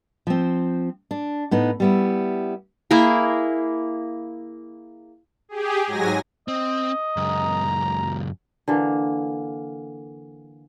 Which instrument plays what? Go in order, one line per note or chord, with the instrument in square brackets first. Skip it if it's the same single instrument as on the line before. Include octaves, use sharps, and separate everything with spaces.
[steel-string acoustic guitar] F3 C4
D4
A2 B3 D#4
G3 B3 E4
[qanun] A#3 E4 G#4 A#4
[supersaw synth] G4 G#4
G#2 F#3 G#5 A#6
[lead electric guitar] C4 [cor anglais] D#5
[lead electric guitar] C#2 F#2 [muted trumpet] A#5
[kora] D3 E3 A#3